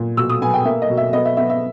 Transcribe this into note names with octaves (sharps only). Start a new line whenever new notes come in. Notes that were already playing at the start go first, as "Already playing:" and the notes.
Already playing: A#2
B2 E6
D#6
B3 G#5
G5
A#3 E5
D#5
B2
E5
B3 D#5
E5
B3 E5
E5